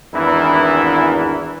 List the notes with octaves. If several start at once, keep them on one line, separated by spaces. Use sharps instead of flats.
G#1 E2 E3 D4 E4 A#4